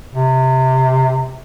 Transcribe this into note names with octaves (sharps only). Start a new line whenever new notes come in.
C3